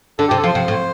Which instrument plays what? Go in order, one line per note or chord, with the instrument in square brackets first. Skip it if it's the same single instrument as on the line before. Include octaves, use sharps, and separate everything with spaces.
[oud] D3 [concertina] A4
[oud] C3 [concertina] G4
[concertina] A4
[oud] F3
[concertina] C5
[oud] C3
A2